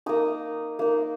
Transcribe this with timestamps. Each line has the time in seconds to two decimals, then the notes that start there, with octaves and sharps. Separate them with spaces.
0.06 A#3 D#4 D#6
0.79 A#3 D#4